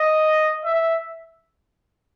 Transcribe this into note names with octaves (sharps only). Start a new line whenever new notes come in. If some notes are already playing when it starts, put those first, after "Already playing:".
Already playing: D#5
E5